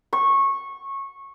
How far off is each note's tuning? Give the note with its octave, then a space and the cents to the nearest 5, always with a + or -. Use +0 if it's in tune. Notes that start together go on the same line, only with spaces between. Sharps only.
C#6 -20